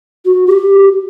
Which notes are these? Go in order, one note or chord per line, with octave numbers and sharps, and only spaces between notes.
F#4
G4